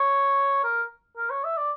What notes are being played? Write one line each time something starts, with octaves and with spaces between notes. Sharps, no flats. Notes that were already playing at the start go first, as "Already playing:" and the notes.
Already playing: C#5
A#4
A#4
C#5
E5
D5